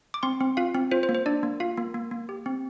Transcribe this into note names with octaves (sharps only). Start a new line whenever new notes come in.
D6
C4 C6
C4
F4 F5
C4
F4 C5
C5
A#3
C5
D4 D5
A#3
F4 F5
A#3
A#3
A#3
G4
C4